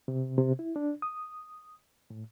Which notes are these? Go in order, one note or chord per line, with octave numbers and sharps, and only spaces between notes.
C3
C3
E4
D4
D#6
A2